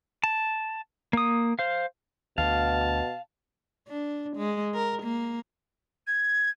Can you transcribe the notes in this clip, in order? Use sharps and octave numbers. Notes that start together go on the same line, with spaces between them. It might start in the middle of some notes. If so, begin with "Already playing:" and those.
A5
A#3 D#6
C5 F5
D2 B2 F5 A5
D4
G#3
A#4
A#3
G#6